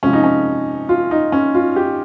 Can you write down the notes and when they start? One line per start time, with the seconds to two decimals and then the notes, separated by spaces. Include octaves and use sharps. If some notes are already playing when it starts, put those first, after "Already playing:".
0.03 C3 F3 G#3 C#4
0.13 D#4
0.24 C#4
0.89 F4
1.11 D#4
1.32 C#4
1.55 F4
1.76 G4